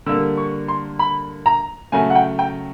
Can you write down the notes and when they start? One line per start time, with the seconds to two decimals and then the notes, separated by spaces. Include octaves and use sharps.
0.06 D3 G3 A#3 E6
0.37 C#6
0.68 C6
0.99 B5
1.46 A#5
1.92 C#3 F#3 A3 G#5
2.10 F#5
2.15 G5
2.39 G5